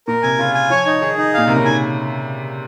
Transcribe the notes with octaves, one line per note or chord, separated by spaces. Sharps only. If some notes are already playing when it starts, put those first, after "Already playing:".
A#2 A#4
C3 G#5
C#3 F4
G#5
F3 C#5
D#4
D#3 G#4
D#4
A#2 F5
C3 A#4
C#3
D#3 G#5